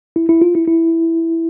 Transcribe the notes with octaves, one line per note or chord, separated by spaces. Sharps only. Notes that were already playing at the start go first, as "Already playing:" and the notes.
E4
E4
F4
E4
E4